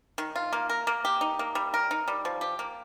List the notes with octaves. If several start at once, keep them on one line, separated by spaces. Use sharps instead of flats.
D#3
F4
A#3
A#4
A#3
G4
D#4
A#3
G3
A#4
D#4
G3
F3
G4
A#3